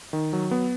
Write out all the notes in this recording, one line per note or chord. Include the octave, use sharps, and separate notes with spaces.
D#3
F#3
B3